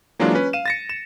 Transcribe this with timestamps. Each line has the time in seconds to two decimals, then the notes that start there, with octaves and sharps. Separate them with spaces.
0.19 E3 F#3 G#3 A#3 D4 F4
0.35 C#4 B4
0.53 F5 D#7 E7
0.66 A6 A#6 C#7
0.89 E7